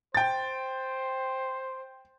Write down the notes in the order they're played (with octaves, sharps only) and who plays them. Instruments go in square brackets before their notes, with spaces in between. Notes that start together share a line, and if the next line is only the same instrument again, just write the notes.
[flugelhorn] C5 [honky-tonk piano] G5 A6